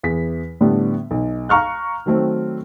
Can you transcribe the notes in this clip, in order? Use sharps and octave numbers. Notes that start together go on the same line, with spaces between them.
E2 G#4 B6
A2 D3 G3 B3 D4
B1
F5 A#5 C#6 F6 F#6
D#3 F#3 A3 C4